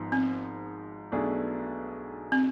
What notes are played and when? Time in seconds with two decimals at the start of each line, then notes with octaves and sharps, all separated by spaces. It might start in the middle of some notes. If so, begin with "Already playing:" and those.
Already playing: G#1 G#2 F3 B3
0.12 C4
1.12 B1 B2 A3 D4 G#4
2.32 C4